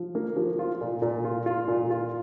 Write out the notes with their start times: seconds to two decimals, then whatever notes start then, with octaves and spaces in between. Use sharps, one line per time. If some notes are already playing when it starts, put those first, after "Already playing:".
Already playing: F3
0.15 A#3
0.36 F3
0.59 F4
0.81 A#2
1.02 A#2
1.25 F4
1.46 F4
1.68 A#2
1.91 F4